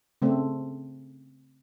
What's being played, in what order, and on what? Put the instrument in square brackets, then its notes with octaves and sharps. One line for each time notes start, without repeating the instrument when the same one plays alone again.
[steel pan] C#3 A3 C4